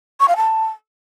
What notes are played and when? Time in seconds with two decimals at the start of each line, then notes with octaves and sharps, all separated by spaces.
0.20 C#6
0.28 F5
0.36 A5